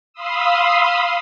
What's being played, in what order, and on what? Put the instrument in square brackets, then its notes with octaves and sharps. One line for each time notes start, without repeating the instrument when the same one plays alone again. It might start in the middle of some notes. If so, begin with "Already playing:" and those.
[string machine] F5 B5 C6 D#6 E6